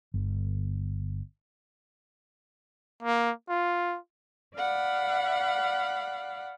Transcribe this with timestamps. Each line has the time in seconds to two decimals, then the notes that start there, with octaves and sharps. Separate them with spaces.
0.14 G1
3.03 A#3
3.49 F4
4.54 D5 F5 F#5 B5